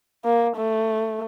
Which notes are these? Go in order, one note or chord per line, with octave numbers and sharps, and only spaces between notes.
A#3
A3